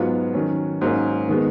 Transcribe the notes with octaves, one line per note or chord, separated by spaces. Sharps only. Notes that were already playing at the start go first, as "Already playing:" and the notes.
Already playing: G#2 F#3 B3 F4
D#3 F#3 C#4
G#2 F#3 A#3 C#4
D#3 G#3 B3